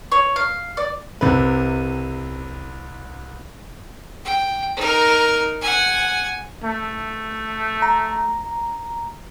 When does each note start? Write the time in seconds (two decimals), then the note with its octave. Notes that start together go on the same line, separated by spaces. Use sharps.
0.12 C#5
0.36 F5
0.77 D5
1.21 C2 C3 B4
4.25 G5
4.76 D#4 A#4
5.61 F#5 G#5
6.64 A3
7.82 A#5